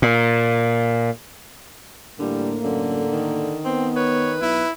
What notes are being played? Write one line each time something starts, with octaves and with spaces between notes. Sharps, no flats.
A#2
A2 D3 G3 A#3
F#2 D3
D#3
B3 C4
B4 C#5
B1 E4